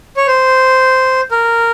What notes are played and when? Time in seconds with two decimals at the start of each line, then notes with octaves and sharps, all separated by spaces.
0.17 C#5
0.27 C5
1.31 A#4